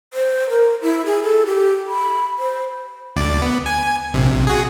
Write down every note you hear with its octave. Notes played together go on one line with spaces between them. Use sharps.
C5
A#4
E4
G#4
A4
G4
B5
C5
D2 D5
B3
G#5
A#1 C3
F#4 G#4